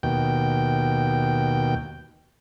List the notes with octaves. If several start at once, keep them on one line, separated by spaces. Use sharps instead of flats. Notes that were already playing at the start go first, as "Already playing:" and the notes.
D#2 B2 G5